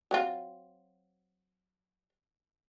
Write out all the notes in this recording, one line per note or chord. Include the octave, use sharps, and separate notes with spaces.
F#3 C4 F4